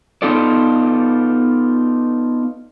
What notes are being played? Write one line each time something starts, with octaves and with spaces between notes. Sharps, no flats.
B3 D#4 F4 A4 D5